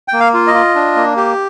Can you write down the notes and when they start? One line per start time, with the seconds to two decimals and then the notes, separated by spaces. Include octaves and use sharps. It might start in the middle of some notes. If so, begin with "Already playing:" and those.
0.08 A#3 G5
0.20 F5
0.34 F4
0.47 D#5
0.54 F4
0.75 D4
0.96 A#3
1.17 G4